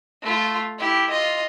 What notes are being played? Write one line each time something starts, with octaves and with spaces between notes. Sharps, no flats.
A3 F4
E4 G4
F4 D#5